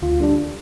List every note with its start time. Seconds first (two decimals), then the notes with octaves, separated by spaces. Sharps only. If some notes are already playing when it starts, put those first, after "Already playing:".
0.02 D2 F4
0.20 D3 G3 D4